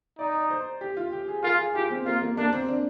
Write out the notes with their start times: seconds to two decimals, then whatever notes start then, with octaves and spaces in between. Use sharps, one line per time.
0.19 D#4 D5
0.34 D5
0.50 C5
0.81 G4
0.97 F4
1.12 G4
1.28 G#4
1.43 F4 A#4
1.58 G#4
1.75 F4 G4
1.90 C4
2.05 A#3 F4
2.22 A#3
2.37 A#3 D4
2.53 C4
2.68 D4